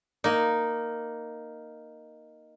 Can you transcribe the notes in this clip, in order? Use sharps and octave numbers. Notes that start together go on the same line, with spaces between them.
A#3 D#4